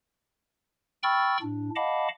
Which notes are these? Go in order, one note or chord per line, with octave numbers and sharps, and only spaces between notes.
G5 B5 C#6 E6 F6 A6
A2 D4
D#5 F5 F#5 A5 B5 D6